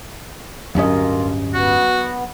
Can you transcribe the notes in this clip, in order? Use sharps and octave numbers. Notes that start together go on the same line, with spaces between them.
D1 G2 F#3 A#3 C#4 F4 D#5
B3 F#4